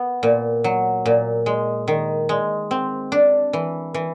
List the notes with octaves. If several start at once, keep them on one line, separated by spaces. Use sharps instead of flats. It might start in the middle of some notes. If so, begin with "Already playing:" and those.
Already playing: B3
A#2
F#3
A#2
G#3
D#3
G#3
C4
D4
E3
E3